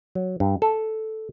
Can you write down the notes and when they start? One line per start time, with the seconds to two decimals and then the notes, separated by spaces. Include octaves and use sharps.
0.15 F#3
0.40 G2
0.62 A4